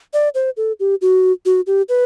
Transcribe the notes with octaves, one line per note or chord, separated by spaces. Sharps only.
D5
C5
A4
G4
F#4
F#4
G4
B4